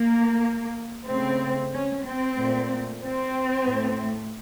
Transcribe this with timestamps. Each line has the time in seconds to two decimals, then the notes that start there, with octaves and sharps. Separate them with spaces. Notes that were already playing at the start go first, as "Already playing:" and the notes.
Already playing: A#3
1.07 C#3 A3 C4
1.71 C#4
2.04 C4
2.36 A#2 A3
3.01 C4
3.65 A2 A3